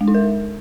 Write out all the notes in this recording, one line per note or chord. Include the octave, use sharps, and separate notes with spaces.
G#3
D#4
A#4